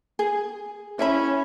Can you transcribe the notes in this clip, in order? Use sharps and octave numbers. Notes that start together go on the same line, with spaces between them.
G#4
C#4 E4 E5 B5